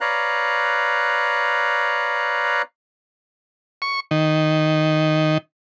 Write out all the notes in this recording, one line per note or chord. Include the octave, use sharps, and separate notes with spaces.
B4 C#5 D5 F5 A#5 F#6
C#6
D#3